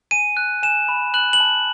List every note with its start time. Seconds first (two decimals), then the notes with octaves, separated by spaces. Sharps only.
0.11 G#5 D#7
0.37 F#6
0.63 G#5 E7
0.89 B5
1.14 F#6 F#7
1.33 F#7
1.40 A5